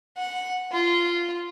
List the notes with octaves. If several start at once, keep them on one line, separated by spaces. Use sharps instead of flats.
F#5
F4